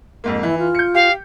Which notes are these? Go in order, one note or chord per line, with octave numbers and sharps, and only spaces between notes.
F2 G#2 A#3
E3 E4
F4
G6 C#7
G4 F5